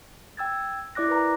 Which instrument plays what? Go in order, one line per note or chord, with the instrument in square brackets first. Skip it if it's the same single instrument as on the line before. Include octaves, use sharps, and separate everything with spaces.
[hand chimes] G5 E6 G#6 A6
E4 D5 D6 F#6 A#6
A#4 B4 A#5